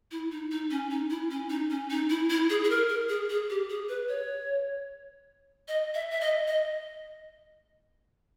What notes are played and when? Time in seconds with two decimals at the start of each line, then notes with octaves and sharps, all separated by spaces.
0.11 E4
0.32 D#4
0.51 D#4
0.71 C#4
0.91 D#4
1.10 E4
1.31 C#4
1.50 D#4
1.70 C#4
1.90 D#4
2.10 E4
2.30 E4
2.50 G#4
2.64 G#4
2.70 A#4
2.89 A#4
3.09 G#4
3.30 G#4
3.50 G4
3.70 G#4
3.89 B4
4.09 C#5
5.68 D#5
5.94 E5
6.11 E5
6.21 D#5
6.47 D#5